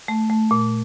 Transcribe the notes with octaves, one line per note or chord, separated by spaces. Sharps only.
A3
A3
A#2